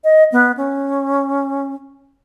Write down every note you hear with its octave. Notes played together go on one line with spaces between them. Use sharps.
D#5
B3
C#4